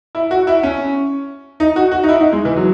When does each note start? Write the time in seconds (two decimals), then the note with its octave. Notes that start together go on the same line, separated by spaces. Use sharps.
0.15 E4
0.31 F#4
0.47 E4
0.63 C#4
1.60 D#4
1.76 F#4
1.92 F#4
2.03 D#4
2.09 E4
2.21 D#4
2.32 G#3
2.45 E3
2.56 F#3